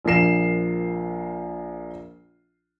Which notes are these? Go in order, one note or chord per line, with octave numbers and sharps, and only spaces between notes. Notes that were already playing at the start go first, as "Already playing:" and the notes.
A#1 F3 A#3 C7 E7